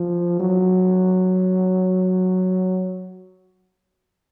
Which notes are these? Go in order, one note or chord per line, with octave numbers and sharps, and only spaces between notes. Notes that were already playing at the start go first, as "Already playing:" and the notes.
Already playing: F3
F#3